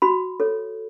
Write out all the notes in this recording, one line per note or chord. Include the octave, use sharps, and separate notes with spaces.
F#4 B5
A4 C#5